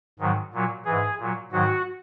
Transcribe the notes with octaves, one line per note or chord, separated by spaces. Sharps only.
G#2 D#3 F#3
A#2 F#3
G#2 E3 G#4
A#2 F#3
G#2 D#3 F#3 F#4